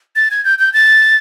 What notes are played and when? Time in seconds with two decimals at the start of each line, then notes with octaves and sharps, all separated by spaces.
0.16 A6
0.31 G#6
0.45 G6
0.59 G6
0.73 A6